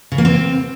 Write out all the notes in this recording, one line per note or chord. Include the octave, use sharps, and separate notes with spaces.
C#3
A#3
C4